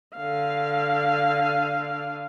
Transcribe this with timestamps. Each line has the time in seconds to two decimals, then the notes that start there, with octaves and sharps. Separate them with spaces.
0.17 D3 F5